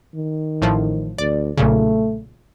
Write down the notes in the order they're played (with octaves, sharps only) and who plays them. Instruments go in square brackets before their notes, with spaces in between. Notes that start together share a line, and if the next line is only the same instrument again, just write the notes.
[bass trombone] D#3
[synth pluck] A1 A2 F3
[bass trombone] D2 [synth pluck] D5
[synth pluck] B1 A#2 C#3 [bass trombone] A3